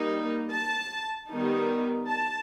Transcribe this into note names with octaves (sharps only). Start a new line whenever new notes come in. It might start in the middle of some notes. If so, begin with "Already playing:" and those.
Already playing: G3 A#3 D#4
A5
D#3 G3 B3 D#4
A5